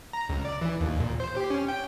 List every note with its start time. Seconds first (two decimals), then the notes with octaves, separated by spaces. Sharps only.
0.13 A#5
0.29 C#2
0.45 D5
0.61 E3
0.80 D#2
1.00 A#2
1.20 C5
1.37 G4
1.50 C#4
1.68 G5